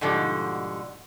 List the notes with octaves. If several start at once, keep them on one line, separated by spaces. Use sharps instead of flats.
G#2 B2 D3 F3 G3